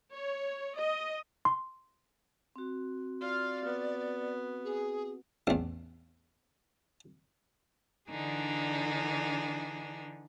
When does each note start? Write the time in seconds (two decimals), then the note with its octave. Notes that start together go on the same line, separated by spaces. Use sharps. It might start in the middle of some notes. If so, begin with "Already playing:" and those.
0.12 C#5
0.76 D#5
1.45 C6
2.56 C4 F#4
3.21 F4 D5 F5
3.65 B3
4.64 G#4
5.47 A1 E2
8.09 D3 E3 D4 D#4 G#4